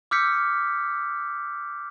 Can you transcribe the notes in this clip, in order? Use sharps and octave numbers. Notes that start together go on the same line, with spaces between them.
D6 E6 F6 G6 B6 C#7